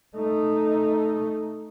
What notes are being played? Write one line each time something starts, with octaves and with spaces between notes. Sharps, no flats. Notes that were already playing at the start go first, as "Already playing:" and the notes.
A3 D#4